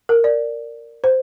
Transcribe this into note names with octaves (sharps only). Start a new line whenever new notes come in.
A#4
D5
C5